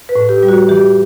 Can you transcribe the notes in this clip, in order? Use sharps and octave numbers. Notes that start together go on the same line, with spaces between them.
B4
A2
G4
G3
F#4
E3 G4